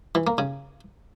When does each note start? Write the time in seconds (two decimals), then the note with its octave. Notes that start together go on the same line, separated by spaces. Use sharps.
0.15 E3
0.27 A#3
0.38 C#3